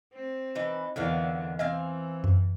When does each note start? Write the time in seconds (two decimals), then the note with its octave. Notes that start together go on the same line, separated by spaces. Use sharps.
0.14 C4
0.55 E3 D#4 B4
0.96 E2 D3 D#3 F5
1.59 E3 C4 D#5 F5 G#5
2.24 F#2